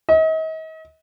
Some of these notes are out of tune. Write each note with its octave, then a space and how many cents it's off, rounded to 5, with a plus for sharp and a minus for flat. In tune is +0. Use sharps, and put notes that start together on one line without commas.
D#5 +40